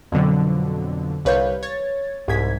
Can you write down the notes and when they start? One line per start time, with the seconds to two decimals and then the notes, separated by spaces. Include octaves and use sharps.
0.12 F2 B2 D3 F#3
1.25 C2 B4 C#5 F5 G6
1.63 C#5 G#6 A6
2.28 C2 G#2 G#6 B6